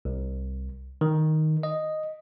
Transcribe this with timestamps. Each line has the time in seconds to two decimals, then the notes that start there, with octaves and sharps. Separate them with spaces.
0.05 C2
1.01 D#3
1.63 D#5